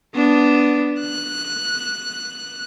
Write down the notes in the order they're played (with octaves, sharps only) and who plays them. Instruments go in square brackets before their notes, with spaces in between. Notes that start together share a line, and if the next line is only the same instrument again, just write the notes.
[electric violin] B3 D4
F#6